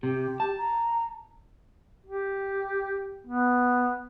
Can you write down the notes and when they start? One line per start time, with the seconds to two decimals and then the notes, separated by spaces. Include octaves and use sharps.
0.03 C3 G4
0.40 A5
0.58 A#5
2.06 G4
3.27 B3